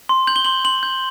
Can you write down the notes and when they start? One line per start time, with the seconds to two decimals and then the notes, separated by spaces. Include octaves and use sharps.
0.09 C6
0.27 G6 F#7
0.36 G7
0.45 C6 F#7
0.65 C6 F#7
0.83 G6